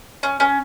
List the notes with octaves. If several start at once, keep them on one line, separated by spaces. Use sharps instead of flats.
C#4
C#4